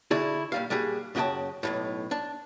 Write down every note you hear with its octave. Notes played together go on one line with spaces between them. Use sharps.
D3 E4 F#4 G#4 D5
A#2 G3 F5
A#2 G3 F#4 G#4
F#2 C#3 F#4 D#5 G5 A5
B1 E2 A2
D4